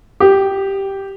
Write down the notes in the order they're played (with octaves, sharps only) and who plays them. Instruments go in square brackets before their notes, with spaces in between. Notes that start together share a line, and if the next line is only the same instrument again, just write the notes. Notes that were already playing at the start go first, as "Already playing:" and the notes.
[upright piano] G4